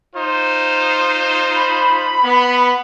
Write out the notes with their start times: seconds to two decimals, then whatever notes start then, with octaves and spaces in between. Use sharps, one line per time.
0.15 D#4 F4 C5
1.56 B5
2.23 B3